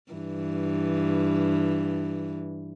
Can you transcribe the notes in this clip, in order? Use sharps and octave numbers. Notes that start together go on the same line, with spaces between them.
G2 E3